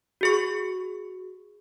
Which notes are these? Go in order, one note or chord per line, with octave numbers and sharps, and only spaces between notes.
F#4 G#4 C#6